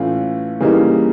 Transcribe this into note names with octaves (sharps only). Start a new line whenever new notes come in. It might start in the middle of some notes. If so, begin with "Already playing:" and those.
Already playing: A2 E3 A3 C#4 F4
C#3 E3 G3 A#3 D#4